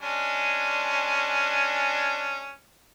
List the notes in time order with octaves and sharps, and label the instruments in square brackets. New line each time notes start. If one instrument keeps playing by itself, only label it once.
[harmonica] G#3 C#4 D4